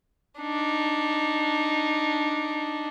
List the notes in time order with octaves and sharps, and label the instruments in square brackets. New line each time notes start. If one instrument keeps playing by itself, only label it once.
[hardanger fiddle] D4 D#4